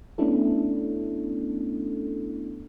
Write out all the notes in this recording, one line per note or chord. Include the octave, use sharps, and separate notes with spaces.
A3 B3 C#4 D4 E4 A4